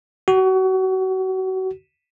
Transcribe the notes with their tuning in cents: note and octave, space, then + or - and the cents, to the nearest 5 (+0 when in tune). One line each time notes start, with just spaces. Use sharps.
F#4 +30